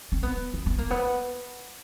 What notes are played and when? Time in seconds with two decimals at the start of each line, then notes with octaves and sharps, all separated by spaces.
0.12 C4
0.23 B3
0.54 C4
0.66 B3
0.78 A#3
0.90 B3